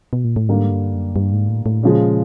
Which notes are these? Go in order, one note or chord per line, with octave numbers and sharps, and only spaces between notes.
B2
A#2
A2
G#2 D3 G3 A#3
G2
F#2
G2
G#2
A2
A2
A#2 C#3 F3 G#3